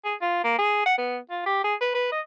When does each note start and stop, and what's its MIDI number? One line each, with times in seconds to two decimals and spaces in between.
0.05 0.15 68
0.22 0.41 65
0.44 0.57 58
0.58 0.84 68
0.86 0.95 78
0.98 1.19 59
1.30 1.46 65
1.46 1.63 67
1.64 1.75 68
1.81 1.91 71
1.95 2.09 71
2.12 2.21 75